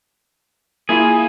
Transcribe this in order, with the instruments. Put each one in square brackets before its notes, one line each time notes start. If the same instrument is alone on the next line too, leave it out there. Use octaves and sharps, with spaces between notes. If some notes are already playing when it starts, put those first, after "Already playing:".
[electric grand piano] A#3 E4 F4 [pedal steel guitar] G#4